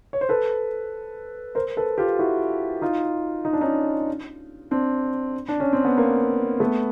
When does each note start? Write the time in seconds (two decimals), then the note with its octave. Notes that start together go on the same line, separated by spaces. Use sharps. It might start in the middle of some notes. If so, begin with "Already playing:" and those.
0.13 C#5
0.21 C5
0.29 A4 B4
1.55 A#4 C5
1.77 A4 B4
1.98 F4 G4
2.19 E4 F#4
2.82 D#4 F4
3.45 D#4
3.53 D4
3.61 C#4 D#4
4.71 C4 D4
5.48 D4
5.60 C#4
5.73 C4
5.85 B3
5.98 A#3
6.60 A3 B3